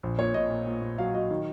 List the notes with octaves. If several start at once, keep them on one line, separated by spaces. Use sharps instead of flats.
A#1
A#2 C#5
A#2 D#5
A#2
A#2
A#2
F#3 F5
F#3 D#5
D#3